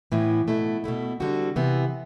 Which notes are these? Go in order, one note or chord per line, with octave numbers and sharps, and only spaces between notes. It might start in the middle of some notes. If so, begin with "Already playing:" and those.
A2 E3 B3 E4
B2 A3 E4
B2 A3 E4
D3 G3 C4 F#4
C3 E3 B3